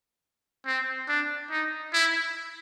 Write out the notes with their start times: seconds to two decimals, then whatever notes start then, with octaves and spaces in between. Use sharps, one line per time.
0.66 C4
1.08 D4
1.51 D#4
1.93 E4